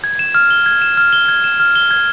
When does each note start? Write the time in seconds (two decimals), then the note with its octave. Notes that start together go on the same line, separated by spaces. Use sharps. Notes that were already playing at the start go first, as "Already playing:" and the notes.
0.04 G#6
0.19 E7
0.35 F6
0.50 G7
0.66 G#6
0.82 E7
0.97 F6
1.13 G7
1.28 G#6
1.44 E7
1.60 F6
1.75 G7
1.91 G#6